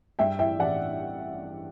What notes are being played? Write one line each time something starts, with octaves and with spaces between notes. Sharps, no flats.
G2 E5 G5
E3 E5 G5
A1 D5 F#5